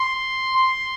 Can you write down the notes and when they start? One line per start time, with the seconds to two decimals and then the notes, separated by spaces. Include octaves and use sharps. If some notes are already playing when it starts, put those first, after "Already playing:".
Already playing: C6
0.56 C6